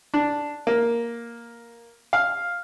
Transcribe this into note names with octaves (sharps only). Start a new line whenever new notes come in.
D4
A#3
F5